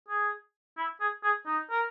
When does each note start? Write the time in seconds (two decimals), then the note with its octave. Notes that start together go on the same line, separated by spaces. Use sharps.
0.09 G#4
0.77 E4
1.00 G#4
1.24 G#4
1.46 D#4
1.71 A#4